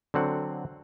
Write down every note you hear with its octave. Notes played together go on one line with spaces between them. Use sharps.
D3 F#3 C4 F#5